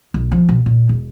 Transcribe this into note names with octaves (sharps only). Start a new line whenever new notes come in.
B1
F3
B2
A#2
E1